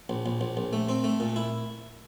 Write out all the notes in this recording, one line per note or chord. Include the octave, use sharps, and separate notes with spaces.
A#1
A#1
A#1
A#1
A3
C4
A3
A#2
E4